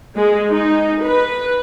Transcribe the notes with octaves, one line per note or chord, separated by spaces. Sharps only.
G#3
D#4
B4